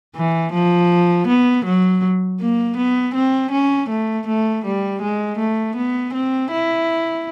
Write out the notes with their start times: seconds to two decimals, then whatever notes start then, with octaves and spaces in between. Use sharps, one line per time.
0.16 E3
0.53 F3
1.28 B3
1.66 F#3
2.41 A#3
2.77 B3
3.15 C4
3.52 C#4
3.89 A3
4.28 A3
4.65 G3
5.02 G#3
5.38 A3
5.76 B3
6.14 C4
6.52 E4